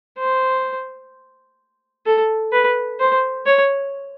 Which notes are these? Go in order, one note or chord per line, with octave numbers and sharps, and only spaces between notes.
C5
A4
B4
C5
C#5